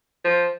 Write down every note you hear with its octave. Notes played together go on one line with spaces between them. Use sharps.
F3